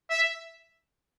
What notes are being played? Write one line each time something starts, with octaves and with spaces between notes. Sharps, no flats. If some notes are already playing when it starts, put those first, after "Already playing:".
E5